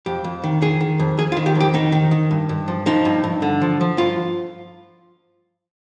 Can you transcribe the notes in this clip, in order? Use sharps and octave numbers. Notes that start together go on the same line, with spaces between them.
F2 G4
F2
D#3
D#3 G#4
D#3
F2
F2 G#4
F4
D#3
G4
F2
G4
D#3 D#4
D#3
D#3
G2
G2
F3
F3 D#4
G2
G2
D3
F3
F3
G2 F4